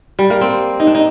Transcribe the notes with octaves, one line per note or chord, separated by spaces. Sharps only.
G3
A#3
C4
D#4
D4
D#4